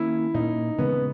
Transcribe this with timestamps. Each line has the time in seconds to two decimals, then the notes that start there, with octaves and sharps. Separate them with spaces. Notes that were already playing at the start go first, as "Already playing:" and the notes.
Already playing: D#3 A#3 C#4 E4
0.34 A#2 A#3 C#4 D#4
0.78 C#3 E3 G#3 B3 C#4